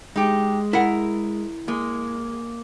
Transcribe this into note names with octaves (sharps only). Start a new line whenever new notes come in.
G#3 D#4 G4
E4 A#4 F#5
G#3 A#3